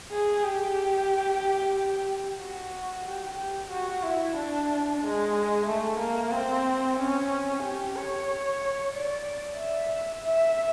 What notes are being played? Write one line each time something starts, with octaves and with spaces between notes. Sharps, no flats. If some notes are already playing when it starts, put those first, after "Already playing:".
G#4
G4
F#4
G4
G4
F#4
E4
D4
G#3
A3
A#3
C4
C#4
G4
C#5
D5
E5
E5